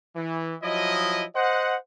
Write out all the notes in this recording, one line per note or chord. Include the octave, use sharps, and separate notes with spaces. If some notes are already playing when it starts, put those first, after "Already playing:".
E3
F3 F#3 E4 D#5
C5 D#5 F#5